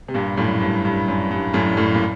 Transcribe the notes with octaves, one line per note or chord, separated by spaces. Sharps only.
C3
G2 A#2
F#2 A2
G2
G2
F#2
G2
F#2 A2
F#2 A2
A#2